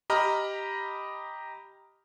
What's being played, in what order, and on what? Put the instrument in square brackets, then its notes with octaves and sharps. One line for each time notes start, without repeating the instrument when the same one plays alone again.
[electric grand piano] G4 D#5 A#5 B5 F6